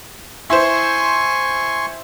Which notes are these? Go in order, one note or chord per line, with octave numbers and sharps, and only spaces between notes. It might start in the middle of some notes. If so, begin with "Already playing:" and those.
E4 C5 G#5 C6 C#6